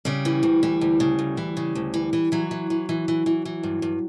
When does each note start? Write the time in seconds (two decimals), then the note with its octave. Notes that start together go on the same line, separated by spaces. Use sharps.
0.05 C#3 G3
0.25 E3
0.43 D2
0.63 E3
0.81 D2
1.00 C#3
1.19 D2
1.37 E3
1.57 C#3
1.75 D2
1.94 E3
2.13 E3
2.32 E3 F#3
2.51 E3
2.70 E3
2.89 E3
3.08 E3
3.26 E3
3.45 E3
3.63 G2
3.82 G2